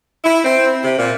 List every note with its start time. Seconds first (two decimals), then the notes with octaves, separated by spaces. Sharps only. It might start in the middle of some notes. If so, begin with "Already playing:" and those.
0.24 E4
0.43 C4
0.83 C3
0.98 A#2